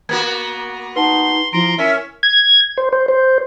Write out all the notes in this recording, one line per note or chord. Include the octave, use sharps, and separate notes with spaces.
A#3 B3 F#4 G#6
D#4 B4 F#5 A5 C6
F3 E4 A#5 C6 D7
C#4 A#4 E5
G#6
C5
C5
C5